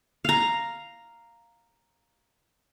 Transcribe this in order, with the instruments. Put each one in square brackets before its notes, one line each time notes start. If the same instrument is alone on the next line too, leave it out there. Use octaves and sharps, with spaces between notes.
[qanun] F5 A#5